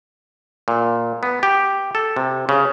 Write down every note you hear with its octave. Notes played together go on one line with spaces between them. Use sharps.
A#2
B3
G4
A4
C3
C#3